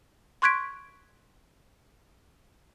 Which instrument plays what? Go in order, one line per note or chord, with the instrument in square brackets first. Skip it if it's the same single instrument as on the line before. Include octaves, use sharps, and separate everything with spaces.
[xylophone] C6 C#6 F#6 G#6 B6 D7